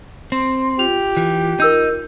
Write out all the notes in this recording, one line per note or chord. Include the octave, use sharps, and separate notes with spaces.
C4 C6
F4 G4 F7
E3
D#4 A#4 E6 G6